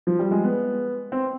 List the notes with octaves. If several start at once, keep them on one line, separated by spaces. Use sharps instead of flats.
F3
G3
G#3
B3
C4